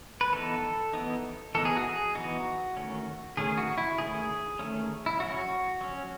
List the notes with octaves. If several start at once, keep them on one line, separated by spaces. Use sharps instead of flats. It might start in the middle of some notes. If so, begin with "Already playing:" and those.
B4
E3 B3 D#4 A4
E3 B3 D#4
E3 B3 D#4 A4
G#4
F#4
G#4
E3 B3 D#4 F#4
D#3 A3 C#4
D#3 A3 C#4 G#4
F#4
E4
D#3 A3 C#4 G#4
D#3 A3 C#4
E4
F#3 C#4 F#4
F#3 C#4